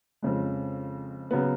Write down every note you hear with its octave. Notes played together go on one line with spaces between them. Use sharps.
F2 C#3 G#3
C#3 F#3 B3